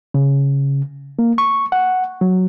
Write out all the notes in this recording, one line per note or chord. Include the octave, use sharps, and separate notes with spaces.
C#3
A#3
C#6
F#5
F#3